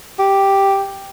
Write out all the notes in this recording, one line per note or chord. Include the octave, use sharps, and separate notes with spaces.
G4